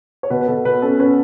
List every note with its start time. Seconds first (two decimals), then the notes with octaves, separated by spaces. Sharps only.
0.23 C#5
0.30 B2 B4
0.41 B4
0.47 B2 A4
0.65 B2 B4
0.82 C#4 A4
0.99 C#4 B4